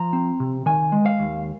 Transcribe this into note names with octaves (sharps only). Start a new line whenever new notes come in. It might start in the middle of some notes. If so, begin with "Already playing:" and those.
Already playing: F3 A#5
C4
C3
D#3 G#5
G#3
F5
D#2